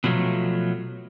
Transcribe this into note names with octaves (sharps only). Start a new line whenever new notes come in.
B2 F3 F#3 A3